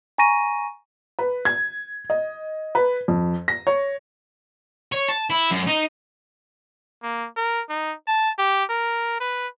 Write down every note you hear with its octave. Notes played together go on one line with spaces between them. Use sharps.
G#5 A#5 C#6 A#6 D#7
B4
G#6
D#5
B4
F2
A#6
C#5
C#5
A5
E4
F#2
D#4
A#3
A#4
D#4
A5
G4
A#4
B4